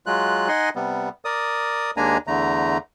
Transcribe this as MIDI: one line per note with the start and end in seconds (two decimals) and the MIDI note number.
0.06 0.48 54
0.06 0.48 56
0.06 0.48 65
0.06 0.48 90
0.48 0.69 63
0.48 0.69 75
0.48 0.69 78
0.48 0.69 80
0.48 0.69 84
0.76 1.09 48
0.76 1.09 55
0.76 1.09 59
1.25 1.91 70
1.25 1.91 74
1.25 1.91 87
1.97 2.18 39
1.97 2.18 56
1.97 2.18 58
1.97 2.18 62
1.97 2.18 80
1.97 2.18 82
2.27 2.78 40
2.27 2.78 50
2.27 2.78 57
2.27 2.78 82